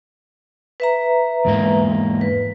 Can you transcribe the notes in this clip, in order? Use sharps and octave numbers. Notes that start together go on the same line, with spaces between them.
B4 E5 A#5
E2 G#2 A#3
B4